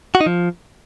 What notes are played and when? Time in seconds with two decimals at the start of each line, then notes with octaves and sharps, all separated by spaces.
0.15 F#4
0.21 D#4
0.26 F3